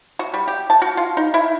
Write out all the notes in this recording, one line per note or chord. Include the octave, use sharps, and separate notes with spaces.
F#4
G3
G4
A5
F#4
F4
D#4
E4